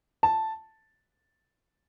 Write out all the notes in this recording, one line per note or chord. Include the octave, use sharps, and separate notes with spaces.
A5